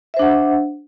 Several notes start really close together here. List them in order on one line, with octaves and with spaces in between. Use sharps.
E5 C5 D4 F#5